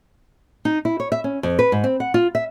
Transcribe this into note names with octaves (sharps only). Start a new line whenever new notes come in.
D#4
E4
C#5
E5
C#4
F2
B4
G#2
C4
F#5
F4
E5